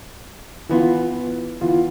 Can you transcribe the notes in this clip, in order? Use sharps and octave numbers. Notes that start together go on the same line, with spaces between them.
E3 B3 F4
E3 B3 F4